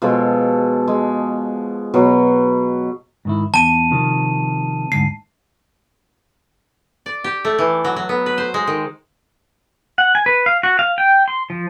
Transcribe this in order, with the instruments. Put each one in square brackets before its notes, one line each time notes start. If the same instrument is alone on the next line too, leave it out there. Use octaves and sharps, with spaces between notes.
[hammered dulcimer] B2 F3 G#3 A4
G#3
B2 F#3 B3
[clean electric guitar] G#2 D#3 E4
[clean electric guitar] E2 [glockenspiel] A5 D#7
[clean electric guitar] C3 D#3 F3
[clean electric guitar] D2 G#2 [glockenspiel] C7
[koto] D5
G4
A3
E3
F#3
F#3
B3
B4
C5
G#3
D#3
[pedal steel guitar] F#5
G#5
B4
F5
F#4
F5
G5
C6
F3